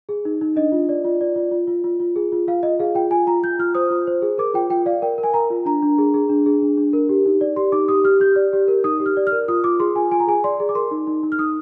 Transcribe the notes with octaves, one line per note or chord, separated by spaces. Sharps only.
G#4
D#4
D#4
D4 D#5
F4
D5
F4
D5
F4
F4
F4
F4
F4
G#4
F4
F4 F5
F4 D#5
G#4 F5
F4 G5
F4 G#5
F4 A#5
F4 G6
F4 F6
C5 D#6
F4
C5
G#4
A#4 D6
F4 G5
F4 G5
D5 F5
A#4 G5
A#4
G#5
A#4 A#5
F4
D4 A#5
D4
G#4
G#4
D4
G#4
D4
D4
A#4
G4
D#4
D5
G4 C6
D#4 D6
G4 D#6
G4 F6
G4 G6
D5
G4
A#4
D#4 D#6
G4
F6
D5
F6
A#4
F4 D#6
F4 D6
G#4 C6
F4 G#5
F4 G#5
A#5
G#4 G#5
D5 C6
G#4
D6
A#4 C6
D#4
D#4
D#4
F6
D#4 D#6